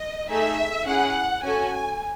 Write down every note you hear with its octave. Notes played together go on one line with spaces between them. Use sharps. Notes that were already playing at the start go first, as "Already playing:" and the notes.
Already playing: D#5
A3 D#4 G#4 E5
C#4 E4 G#4 F#5
C#4 F#4 A4 G#5